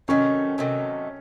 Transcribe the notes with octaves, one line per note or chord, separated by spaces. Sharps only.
C3 D#3 F#3 A3 C#4
C3 D#3 F#3 A3